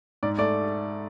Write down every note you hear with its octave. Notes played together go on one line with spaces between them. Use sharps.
G#2 D5
A3 D5